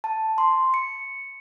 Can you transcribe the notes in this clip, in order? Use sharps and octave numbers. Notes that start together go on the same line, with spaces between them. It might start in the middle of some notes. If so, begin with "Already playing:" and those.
A5
C6
C#7